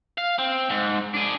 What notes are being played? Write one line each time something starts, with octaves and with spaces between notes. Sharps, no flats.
F5
C4
G#2
D4 G#4